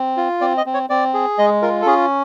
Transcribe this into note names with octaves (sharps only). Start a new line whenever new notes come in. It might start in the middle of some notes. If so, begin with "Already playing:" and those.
Already playing: C4
F4
C4 D5
D#5
C4
C#5
C4 D5
G#4
G#3 D#5
F4 A#4
A4
C#4 G#4